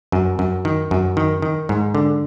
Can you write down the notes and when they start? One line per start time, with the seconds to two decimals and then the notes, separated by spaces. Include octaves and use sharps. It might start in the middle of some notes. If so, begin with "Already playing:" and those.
0.12 F#2
0.39 F#2
0.65 D#3
0.91 F#2
1.17 D#3
1.42 D#3
1.69 G#2
1.95 D3